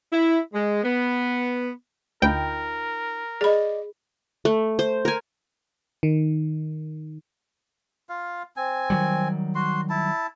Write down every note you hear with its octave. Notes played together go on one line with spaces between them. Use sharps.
E4
G#3
B3
D2 D#4 F4 A#4 G5 B5
G#4 D5 D#5 B5
A3
C5
A#4 G#5
D#3
F4 F5
C4 G#5
D#3 F#3 G3
F#4 C6
E4 A5